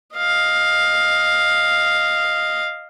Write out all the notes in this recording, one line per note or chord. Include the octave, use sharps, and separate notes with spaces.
D#5 F5